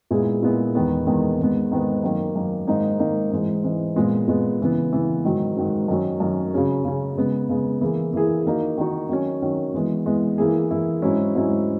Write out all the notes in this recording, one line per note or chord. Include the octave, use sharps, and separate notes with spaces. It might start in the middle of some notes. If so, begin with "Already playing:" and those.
A#2 G#3 B3 E4 G#4
A#2 G#3 B3 E4 G#4
E2 D#3 G#3 B3
E2 D#3 G#3 B3
G#2 D#3 G#3 B3
G#2 D#3 G#3 B3
F#2 D#3 A#3
F#2 D#3 A#3
G#2 D#3 A#3 D#4
G#2 D#3 A#3 D#4
G#2 E3 G#3
G#2 E3 G#3
A#2 G#3 B3
A#2 G#3 B3
C#3 E3 B3
C#3 E3 B3
G#2 D#3 F#3
G#2 D#3 F#3
F#2 D#3 F#3 C#4
F#2 D#3 F#3 C#4
C#3 F#3 C#4 G#4
C#3 F#3 C#4 G#4
C#3 G#3 B3
C#3 G#3 B3
E3 A#3 E4 G#4
E3 A#3 E4 G#4
D#3 A#3 D#4 F#4
D#3 A#3 D#4 F#4
D#3 F#3 C#4
D#3 F#3 C#4
E3 G#3 B3
E3 G#3 B3
E3 A#3 E4 G#4
E3 A#3 E4 G#4
G#2 F#3 C#4 E4
G#2 F#3 C#4 E4